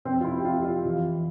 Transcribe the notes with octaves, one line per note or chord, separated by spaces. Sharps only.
F2 C4
F4
E4
G4
F2 F4
F4
E3